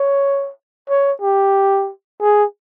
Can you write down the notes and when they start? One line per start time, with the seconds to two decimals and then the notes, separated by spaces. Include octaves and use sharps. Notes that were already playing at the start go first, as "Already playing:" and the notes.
Already playing: C#5
0.89 C#5
1.22 G4
2.21 G#4